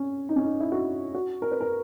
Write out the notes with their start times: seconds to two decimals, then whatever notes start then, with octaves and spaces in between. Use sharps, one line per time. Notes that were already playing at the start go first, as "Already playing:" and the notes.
Already playing: C#4
0.29 D#4
0.36 C#4
0.44 D#4
0.60 E4
0.72 F#4
1.15 F#4
1.42 A#4
1.52 B4
1.60 A#4